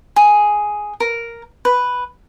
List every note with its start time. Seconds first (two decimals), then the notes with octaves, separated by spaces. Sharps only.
0.16 G#4
1.00 A#4
1.65 B4